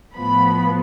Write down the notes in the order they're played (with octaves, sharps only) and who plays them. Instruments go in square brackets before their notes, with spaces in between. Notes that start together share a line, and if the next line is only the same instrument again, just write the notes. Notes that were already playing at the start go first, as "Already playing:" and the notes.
[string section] A2 F3 B3 B5